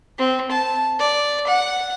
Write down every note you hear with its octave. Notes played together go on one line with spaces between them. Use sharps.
C4
A5
D5
F#5